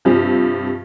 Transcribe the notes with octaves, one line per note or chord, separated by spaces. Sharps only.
G2 C3 F3